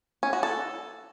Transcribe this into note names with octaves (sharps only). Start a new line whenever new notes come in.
C#4
F#4
A4